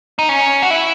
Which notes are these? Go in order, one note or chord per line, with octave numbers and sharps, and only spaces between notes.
D#4
C#4
F#4
E4